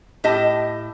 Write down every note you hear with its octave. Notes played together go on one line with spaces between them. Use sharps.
A2 G4 D#5 A5